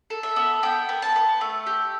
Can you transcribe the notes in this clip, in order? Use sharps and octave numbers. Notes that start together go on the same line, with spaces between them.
A4
E5
B3
B3 G5
B3
A5
B3
A3
G4